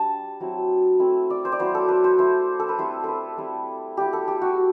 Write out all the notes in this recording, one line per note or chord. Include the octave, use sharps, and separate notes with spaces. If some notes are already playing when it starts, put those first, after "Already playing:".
Already playing: G3 D4 A5
F#3 C4 E4
A3 C4 E4
D5
C5
D5
F#3 B3 E4 C5
A4
B4
C5
A3 E4 C5
A4
B4
G3 C4 E4 C5
A4 B4
G3 C4 E4
G3 B3 E4 G4
A4
G4
F#4